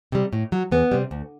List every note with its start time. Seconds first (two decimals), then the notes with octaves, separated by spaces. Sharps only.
0.12 C3 G3
0.33 A2
0.52 F#3
0.71 E2 B3
0.91 C3 G3
1.11 D2